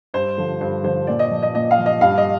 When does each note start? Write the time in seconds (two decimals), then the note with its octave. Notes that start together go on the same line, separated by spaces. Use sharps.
0.14 G2 C5
0.37 D3 F3
0.61 G2 C5
0.84 D3 F3 C5
1.07 A#2 D5
1.19 D#5
1.31 F3
1.43 D#5
1.55 A#2 D#5
1.71 F5
1.79 F3
1.86 D#5
2.01 G2 F5
2.18 D#5